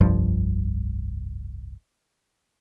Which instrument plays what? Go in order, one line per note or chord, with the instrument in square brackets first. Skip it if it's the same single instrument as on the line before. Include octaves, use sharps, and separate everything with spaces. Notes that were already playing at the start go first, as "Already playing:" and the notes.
[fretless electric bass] F1 C2 G2 F3